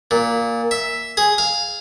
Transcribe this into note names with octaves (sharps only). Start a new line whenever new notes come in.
A#2
E5
G#4
F5